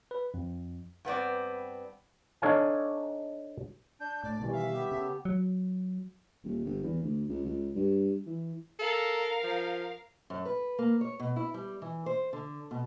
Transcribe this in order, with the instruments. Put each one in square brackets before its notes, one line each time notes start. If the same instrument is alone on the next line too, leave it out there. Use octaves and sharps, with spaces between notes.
[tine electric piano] B4
F2
[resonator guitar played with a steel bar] G2 B3 C4 D5
[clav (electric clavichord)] D4 D#4 A4 C#5 F5 G#5
[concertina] D4 [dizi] G6
[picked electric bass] A2 [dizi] D5
[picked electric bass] B2 D#3 G3 [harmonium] E3
[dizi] E5 [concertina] F5
[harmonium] B3 G4
[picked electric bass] C#3 [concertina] A4
[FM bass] F#3
[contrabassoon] D#1
G1
E2
D2
C#2
C#2
G2
E3
[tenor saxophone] A4 [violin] A#4 F5
[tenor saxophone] F3
[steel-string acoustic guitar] F#2
B4
A#3
C#5
B2
E4
G3
E3
C5
D3
B2